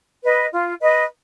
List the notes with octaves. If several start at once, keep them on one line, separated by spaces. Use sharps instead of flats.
B4 D#5
F4
B4 D#5